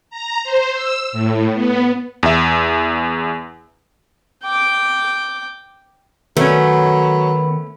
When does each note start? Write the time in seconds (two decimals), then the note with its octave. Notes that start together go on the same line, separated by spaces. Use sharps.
0.10 A#5
0.44 C5
0.74 E6
1.13 A2
1.54 B3
2.23 E2 E5
4.44 G5 D6
6.37 D#3 F#3 A3 B3 C#4